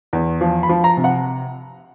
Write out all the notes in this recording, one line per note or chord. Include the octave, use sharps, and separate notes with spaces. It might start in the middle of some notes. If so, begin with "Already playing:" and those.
E2
F3
B5
F3
A#5
C3
F#5